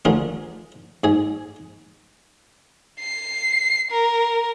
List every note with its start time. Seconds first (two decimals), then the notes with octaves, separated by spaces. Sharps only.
0.05 D3 F3 A3 F4 G#4 A#4
1.04 G#2 G#4 G#5
2.99 C7
3.90 A#4